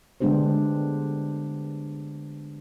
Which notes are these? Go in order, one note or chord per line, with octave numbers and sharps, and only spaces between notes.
D3 G#3 B3 D4 G4 C5